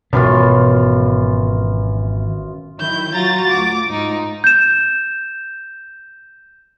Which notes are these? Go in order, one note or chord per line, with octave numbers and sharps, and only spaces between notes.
G#1 F#2 B2 E3 B3 F4
D#3 F#3 E4 G6
F#3 F4 F#4 A#5 A6
D2 D6
G#2 D#4 F4
G6 E7